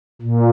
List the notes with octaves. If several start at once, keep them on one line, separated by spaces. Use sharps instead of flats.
A#2